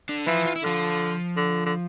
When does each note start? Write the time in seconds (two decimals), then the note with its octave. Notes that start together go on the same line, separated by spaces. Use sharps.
0.09 D3 D4
0.27 E3 F3 F4
0.45 F4
0.56 E4
0.63 D3 F3 F4
1.37 D3
1.66 D3